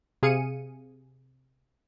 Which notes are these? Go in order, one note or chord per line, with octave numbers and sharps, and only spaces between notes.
C3 G#4 F5 C#7 D#7